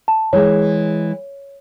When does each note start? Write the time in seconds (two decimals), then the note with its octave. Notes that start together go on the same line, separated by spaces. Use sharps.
0.08 A5
0.33 E3 G#3 C#5